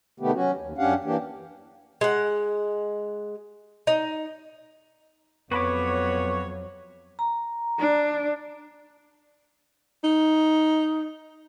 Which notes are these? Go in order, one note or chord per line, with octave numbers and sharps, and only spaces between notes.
C3 D#3 A3 B3 G4
F#3 C#4 F#4
D#2
F#2 C#4 D4 G4 F5 F#5
E3 A#3 D4 G4
G#3 F#5
D#4
F2 F#3 B3 F#4 C#5 B5 D6
A#5
D4
D#4